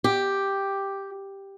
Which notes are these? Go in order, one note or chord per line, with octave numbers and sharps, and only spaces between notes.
G4